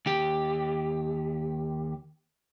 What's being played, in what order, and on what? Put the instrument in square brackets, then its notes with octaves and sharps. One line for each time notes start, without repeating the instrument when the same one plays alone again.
[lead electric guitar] D#2 G4